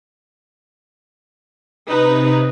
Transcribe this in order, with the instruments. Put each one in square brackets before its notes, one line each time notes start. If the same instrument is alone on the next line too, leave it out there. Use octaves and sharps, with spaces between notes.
[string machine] C3 [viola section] D#4 B4